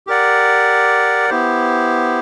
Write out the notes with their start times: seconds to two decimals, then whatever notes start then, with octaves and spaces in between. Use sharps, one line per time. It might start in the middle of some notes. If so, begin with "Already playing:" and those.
0.07 G4 A#4 D5 F#5
1.29 B3 E4 G4 C5